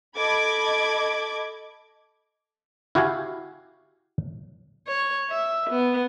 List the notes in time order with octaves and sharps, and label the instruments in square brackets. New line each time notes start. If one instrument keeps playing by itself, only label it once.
[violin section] A4 D#5 B5 D6 G#6
[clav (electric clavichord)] E4 F#4 G4 F5 G#5
[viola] C#5
E5
B3